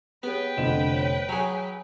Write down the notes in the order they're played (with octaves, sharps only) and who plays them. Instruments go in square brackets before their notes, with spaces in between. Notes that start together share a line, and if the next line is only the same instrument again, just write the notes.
[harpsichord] B3 [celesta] G4 G#4 C#5 [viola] B4 G5
[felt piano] F1 D3 E7 [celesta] F4 C5 D#5
[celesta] C5 C#5
[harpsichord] F#3 G#4 [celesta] G#5 C#7 [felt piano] A#5